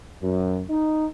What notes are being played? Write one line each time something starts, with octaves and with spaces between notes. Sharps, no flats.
F#2
D#4